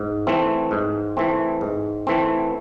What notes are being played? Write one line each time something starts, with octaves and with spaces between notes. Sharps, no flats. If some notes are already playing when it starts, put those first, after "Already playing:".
Already playing: G#2
E3 A3 C4
G#2
E3 A3 C4
G#2
E3 A3 C4